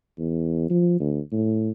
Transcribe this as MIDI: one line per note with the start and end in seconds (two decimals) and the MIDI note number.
0.18 0.69 40
0.70 0.96 53
1.00 1.20 38
1.32 1.70 45